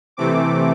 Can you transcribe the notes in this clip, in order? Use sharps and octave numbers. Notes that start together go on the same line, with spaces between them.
C3 E3 A3 C4 D6